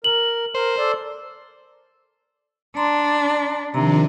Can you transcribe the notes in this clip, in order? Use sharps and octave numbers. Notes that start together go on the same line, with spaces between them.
A#4 F#7
A#4 C5
A4 D5
D4 A#5 C6
C3 D#3 F3 D4 A#5